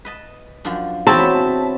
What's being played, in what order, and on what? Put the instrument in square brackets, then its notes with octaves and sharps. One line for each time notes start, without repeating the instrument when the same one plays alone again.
[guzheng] B4 D#5 A5
F#2 F3 D4
[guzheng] E2 B3 [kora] C4 [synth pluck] F#4 C#5 B5 [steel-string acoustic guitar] A5